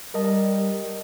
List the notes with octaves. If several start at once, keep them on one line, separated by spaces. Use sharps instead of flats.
G3 A#4 D#5 A5